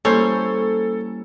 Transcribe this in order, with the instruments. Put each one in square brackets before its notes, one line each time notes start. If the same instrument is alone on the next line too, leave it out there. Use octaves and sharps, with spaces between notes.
[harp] G3 A#3 E4 [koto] C#4 [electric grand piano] A4 [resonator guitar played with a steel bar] C5 C#5